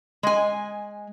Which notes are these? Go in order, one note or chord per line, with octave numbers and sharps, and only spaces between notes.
G#3 G#5